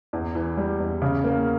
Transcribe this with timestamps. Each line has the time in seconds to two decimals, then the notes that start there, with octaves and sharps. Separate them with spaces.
0.13 E2
0.35 E3
0.57 G3
0.80 E2
1.02 C#3
1.24 A#3